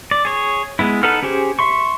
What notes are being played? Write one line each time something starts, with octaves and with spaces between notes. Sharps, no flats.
D5
G#4 C#5
G#3 B3 E4
D#4 A4 B4 F#5 F6
C#4 G4 G#4 C5
E5 C6 C#6